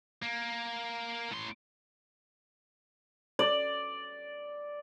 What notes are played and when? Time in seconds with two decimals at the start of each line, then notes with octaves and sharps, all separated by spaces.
0.22 A#3
1.31 A2 C6
3.39 D5